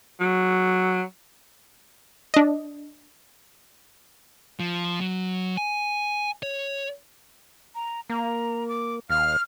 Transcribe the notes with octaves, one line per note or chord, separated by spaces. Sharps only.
F#3
D4 D#5
F3
F#3
G#5
C#5
A#5
A#3 A#5
D6
D#2 F5 F6